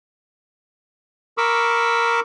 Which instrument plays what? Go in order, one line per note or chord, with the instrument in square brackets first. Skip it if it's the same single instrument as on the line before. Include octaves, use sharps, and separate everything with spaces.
[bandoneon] A#4 B5 C#6 D6 E6